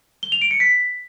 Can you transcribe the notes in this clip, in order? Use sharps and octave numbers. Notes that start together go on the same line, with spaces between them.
G7
F7
D7
C#7
B6